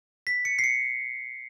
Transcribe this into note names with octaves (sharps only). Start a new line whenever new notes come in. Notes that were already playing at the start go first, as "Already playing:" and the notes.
B6
C#7
C7
C#7